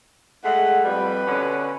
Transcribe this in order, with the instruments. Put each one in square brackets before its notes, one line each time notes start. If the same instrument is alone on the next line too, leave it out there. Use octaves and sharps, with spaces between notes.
[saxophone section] G#3 A3 [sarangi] F#5
[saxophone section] F2 G3 [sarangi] B4
[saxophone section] B2 D3 C#4